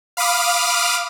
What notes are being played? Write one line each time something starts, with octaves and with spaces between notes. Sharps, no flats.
F5 B5 D6 D#6 F6